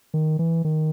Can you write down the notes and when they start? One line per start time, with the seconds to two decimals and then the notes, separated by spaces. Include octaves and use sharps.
0.14 D#3
0.39 E3
0.64 D#3